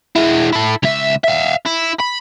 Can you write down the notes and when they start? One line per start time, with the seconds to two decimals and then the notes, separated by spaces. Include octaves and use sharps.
0.15 G#3 E4
0.53 E4 A4
0.83 C#2 E5
1.24 E5 F5
1.66 E4
2.00 B5